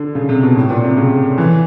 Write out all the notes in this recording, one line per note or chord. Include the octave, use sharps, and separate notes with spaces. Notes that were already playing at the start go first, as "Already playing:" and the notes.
Already playing: D3
C#3
C3
B2
A2
A#2
C3
C#3
E3